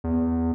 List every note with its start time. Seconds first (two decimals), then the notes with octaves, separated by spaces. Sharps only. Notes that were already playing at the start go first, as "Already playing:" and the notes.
0.04 E2